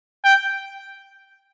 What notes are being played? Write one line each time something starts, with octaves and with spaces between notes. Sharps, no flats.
G5